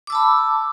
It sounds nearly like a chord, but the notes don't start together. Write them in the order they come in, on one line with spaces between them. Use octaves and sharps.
D6 E6 A5 B5